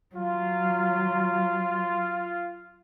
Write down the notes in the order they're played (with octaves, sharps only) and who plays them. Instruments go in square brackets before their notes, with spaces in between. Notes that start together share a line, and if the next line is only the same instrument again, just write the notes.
[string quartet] F#3 [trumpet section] F4